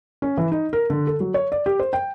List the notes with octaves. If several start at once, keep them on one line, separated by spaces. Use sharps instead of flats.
C#4
E3
D#4
A#4
D3
A4
F#3
C#5
D5
G4
C5
G5